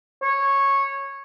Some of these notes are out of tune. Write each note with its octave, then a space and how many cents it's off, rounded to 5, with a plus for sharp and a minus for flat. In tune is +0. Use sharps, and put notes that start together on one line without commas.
C#5 -10